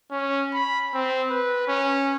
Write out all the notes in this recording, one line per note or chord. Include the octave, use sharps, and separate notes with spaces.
C#4
B5
C4
B4
C#4